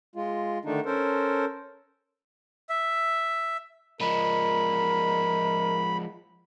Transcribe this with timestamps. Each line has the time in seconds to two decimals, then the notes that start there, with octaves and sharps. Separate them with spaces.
0.15 G#3 F4
0.65 D3 D#3 A3 D4 D#4
0.86 C#4 A4 A#4 C5
2.69 E5
4.01 F3 G#3 A#4 B5